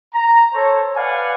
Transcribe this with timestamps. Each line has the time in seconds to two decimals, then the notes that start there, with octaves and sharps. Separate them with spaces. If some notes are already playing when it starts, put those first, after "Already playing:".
0.14 A#5
0.54 A4 C5 C#5
0.96 B4 D5 F5 F#5 G#5